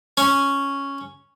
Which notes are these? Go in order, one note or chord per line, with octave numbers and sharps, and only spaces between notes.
C#4